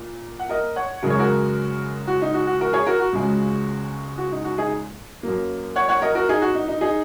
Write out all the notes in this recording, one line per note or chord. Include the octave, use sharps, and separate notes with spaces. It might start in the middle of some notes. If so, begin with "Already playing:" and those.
Already playing: A#2
F#5
A#4 D#5
C#5 F#5
F#2 C#3 G#3 A#4
C#5
F#4 A#4
F#4
D#4
F#4
F#4
F#4 A#4
G#4 C#5
F#4 A#4
F#4
C#2 C#3 G#3
F#4
D#4
F#4
D#4 G#4
F#2 F#3 A#3
C#5 F#5
C#5 F#5
A#4 D#5
F#4 A#4
D#4 G#4
F#4
D#4
D#4
D#4 G#4